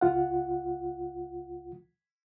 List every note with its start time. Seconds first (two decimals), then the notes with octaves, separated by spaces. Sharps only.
0.01 C#2 F4 F#5